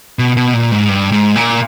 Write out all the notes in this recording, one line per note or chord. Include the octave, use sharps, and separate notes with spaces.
B2
B2
A#2
G#2
G2
G#2
A#2